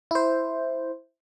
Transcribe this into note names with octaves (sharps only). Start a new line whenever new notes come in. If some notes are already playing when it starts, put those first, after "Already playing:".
E4 C5